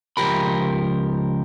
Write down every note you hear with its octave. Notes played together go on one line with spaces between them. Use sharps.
C#2 F3 G4 A#4 B5